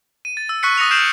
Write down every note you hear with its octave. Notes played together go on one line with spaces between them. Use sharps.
D#7
A6
E6
C#6 F#6 B6 C#7
D#6 A#6 C#7 F7
F6 G6 C7 D7 E7 F#7